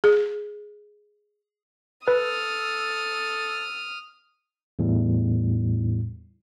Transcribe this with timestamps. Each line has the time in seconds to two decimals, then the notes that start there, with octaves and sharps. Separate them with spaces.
0.04 G#4
2.08 A4 B4 D#6 F6
4.79 E2 A2 G3